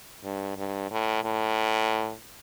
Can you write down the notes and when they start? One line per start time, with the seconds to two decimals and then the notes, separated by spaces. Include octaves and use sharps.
0.24 G2
0.57 G2
0.91 A2
1.24 A2